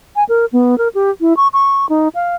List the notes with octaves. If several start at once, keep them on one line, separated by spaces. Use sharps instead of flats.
G#5
A#4
B3
A#4
G4
E4
C#6
C#6
D#4
F5